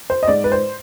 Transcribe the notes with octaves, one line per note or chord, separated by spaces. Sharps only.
C5
D#5
G#2 D5
B4
C5